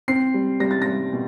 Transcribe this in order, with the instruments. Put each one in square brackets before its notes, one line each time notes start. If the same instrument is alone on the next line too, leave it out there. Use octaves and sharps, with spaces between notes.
[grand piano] C4 C7
G3
G3 A#6
A6
G3 A#6
B2